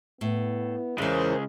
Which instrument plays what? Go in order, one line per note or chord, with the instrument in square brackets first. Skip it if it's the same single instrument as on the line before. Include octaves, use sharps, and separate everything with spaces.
[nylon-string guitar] A2 [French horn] B3
[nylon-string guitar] E2 E3 [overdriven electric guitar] C#3 G#3 [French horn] C#4 [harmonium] A#4 C5